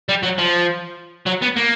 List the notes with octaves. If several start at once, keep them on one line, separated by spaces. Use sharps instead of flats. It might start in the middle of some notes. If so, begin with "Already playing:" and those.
G3
F#3
F3
F#3
B3
A#3